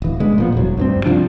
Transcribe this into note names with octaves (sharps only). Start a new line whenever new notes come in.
D1 E3
D3 G#3 B3
A#2 F3 B3
E1 C2 F#3
D2 G2 C4
C3 F3 G3 D4